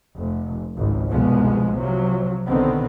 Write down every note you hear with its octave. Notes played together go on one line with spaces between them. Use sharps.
F1
G#1 C#2
F1 C2 B2 F3 G#3 B3
C3 F3 F#3
B1 D3 D#3 B3 C4